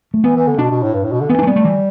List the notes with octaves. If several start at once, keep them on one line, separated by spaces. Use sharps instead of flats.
A3
E3 B3
E3
D3
B2 D4
B2
A2
G2
A2
B2
D3
E3 B3
D4
A3
G3 B3
A3
E3